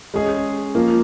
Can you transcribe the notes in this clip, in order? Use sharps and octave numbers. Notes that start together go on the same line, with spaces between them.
G#3 C#4 G#4
F3 A#3